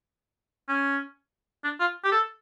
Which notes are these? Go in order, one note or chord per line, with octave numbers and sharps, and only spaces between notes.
C#4
D4
F4
G4
A4